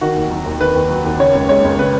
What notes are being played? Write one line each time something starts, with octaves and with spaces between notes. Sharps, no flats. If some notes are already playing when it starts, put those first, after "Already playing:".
D#3 F#4
D#2
F#3
D#2
D#3 B4
D#2
F#3
D#2
C#3 C#5
C#2
G#3 C#5
C#2
C#3 B4